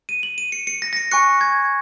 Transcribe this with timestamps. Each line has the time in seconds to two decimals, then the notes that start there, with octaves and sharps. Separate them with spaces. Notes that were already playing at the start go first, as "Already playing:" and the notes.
0.09 D#7
0.23 F#7
0.38 D#7
0.52 C#7
0.67 C#7
0.82 A#6
0.93 A#6
0.96 C#7
1.11 G#5 C#6 F#6 C#7
1.41 G#6